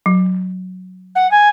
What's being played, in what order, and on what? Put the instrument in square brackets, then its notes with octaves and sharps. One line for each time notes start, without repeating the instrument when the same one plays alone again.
[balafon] F#3
[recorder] F#5
G#5